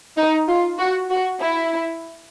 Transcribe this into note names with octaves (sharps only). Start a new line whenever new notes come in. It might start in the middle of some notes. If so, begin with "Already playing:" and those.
D#4
F4
F#4
F#4
E4